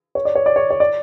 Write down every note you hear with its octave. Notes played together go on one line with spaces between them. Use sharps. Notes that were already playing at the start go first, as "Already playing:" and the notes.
C#5
D5
C#5
D5
C#5
C#5
D5